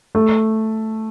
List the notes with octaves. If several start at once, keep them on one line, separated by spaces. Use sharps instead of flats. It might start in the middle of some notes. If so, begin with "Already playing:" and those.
A3